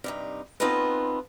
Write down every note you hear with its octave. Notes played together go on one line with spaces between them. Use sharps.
G2 C3 D#4
B3 C4 D#4 F4 A4 B4